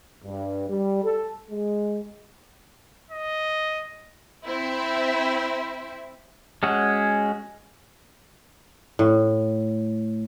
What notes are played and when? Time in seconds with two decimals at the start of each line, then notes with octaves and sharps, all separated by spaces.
0.24 G2
0.69 G3
1.03 A4
1.51 G#3
3.11 D#5
4.46 C4 E4 C5 E5
6.63 G#3 C#4 F#4 G#4
8.99 A2